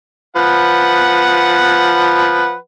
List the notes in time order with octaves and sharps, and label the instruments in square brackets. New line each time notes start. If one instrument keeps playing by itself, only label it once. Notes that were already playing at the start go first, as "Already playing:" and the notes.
[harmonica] F3 B4 F#5